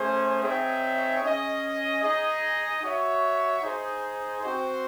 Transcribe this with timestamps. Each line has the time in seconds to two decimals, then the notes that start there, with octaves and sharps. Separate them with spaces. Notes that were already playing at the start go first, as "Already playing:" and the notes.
Already playing: A3 C#4 G#4 C5
0.43 C4 D#4 G#4 C#5 E5
1.23 C#4 G#4 D#5
2.03 D#4 G#4 D#5
2.83 F#4 C#5 E5
3.62 D#4 G#4 C5
4.43 C4 F#4 C5